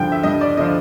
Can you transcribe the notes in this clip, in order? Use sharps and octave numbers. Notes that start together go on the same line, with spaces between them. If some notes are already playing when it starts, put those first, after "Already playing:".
Already playing: G2 D3 F3 G5
E5
G2 D#5
D5
D3 F3 D#5